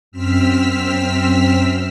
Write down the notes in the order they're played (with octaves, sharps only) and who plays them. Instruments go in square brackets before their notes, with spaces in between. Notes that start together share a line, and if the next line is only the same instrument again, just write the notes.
[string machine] F#2 C4 E6 F6 B6